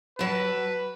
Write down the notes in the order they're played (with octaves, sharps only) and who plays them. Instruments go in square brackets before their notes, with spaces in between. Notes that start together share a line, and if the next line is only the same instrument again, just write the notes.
[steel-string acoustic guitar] F#3 A5 [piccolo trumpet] B4